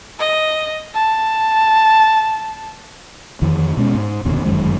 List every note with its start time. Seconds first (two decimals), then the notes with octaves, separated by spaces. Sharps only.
0.20 D#5
0.95 A5
3.42 F2 D#3 E3
3.77 B2 G#3 C#4
3.94 G#2
4.25 F1 D#2 B2 D3
4.45 G1 F#2 D#3 G#3